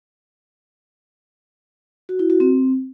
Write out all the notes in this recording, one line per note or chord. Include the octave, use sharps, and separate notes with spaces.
F#4
E4
F#4
C4